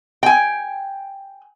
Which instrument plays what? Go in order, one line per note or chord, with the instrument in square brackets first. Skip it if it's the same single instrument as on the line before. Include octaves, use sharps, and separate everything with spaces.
[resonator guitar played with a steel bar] G5 G#5